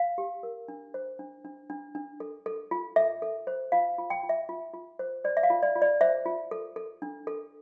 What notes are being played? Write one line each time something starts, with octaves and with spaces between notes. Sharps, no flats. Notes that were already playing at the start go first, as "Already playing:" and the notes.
Already playing: F5
G4
A#4
D4
C5
D4
D4
D4
D4
A4
A4
F4
A4 E5
A4
C5
F4 F5
F4
G5
F4
E5
F4
F4
C5
C5 D5
E5
F5
F4
D5
F4
D5
C5 E5
F4
A4
A4
D4
A4